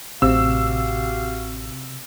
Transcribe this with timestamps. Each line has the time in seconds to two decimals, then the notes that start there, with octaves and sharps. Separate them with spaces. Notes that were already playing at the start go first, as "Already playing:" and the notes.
0.22 A1 C3 F#4 G4 F5 E6